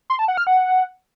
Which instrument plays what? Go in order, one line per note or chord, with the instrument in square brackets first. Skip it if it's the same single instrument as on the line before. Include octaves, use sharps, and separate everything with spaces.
[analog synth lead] C6
A5
F#5
F6
F#5